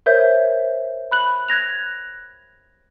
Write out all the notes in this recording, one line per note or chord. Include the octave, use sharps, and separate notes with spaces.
A#4 C5 C#5 E5 G6
B5 F#6 F#7
F#6 G#6 A#6 F7